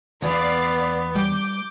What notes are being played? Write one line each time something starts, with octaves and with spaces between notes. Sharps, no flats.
E2 B3 D5 F5
G3 D6 G6